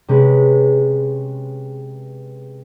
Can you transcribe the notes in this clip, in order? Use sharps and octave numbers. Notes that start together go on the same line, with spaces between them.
C3 G#3 C#4 B4